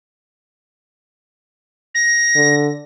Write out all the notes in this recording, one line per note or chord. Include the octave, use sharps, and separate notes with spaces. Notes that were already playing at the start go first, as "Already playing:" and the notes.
A#6
D3